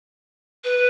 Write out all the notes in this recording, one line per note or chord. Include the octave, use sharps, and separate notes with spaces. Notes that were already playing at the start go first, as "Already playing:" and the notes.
B4